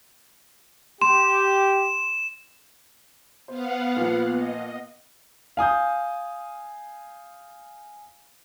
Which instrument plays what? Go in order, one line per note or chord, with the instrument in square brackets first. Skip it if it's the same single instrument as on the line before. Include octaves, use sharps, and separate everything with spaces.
[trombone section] G4 [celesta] C6 [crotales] E7
[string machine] B3 F5 F#5 [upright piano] C5
[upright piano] A#2 F3
[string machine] D#5
[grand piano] F5 G#5 D#6 G6